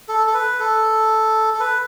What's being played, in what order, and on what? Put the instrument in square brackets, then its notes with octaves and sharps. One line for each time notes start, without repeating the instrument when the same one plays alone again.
[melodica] A4
A4
B4
A4
A4
B4